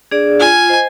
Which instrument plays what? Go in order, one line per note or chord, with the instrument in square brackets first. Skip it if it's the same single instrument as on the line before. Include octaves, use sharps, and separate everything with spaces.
[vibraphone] D4 G#4 D5
[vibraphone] F4 [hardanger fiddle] G#5
[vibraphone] C5 D#5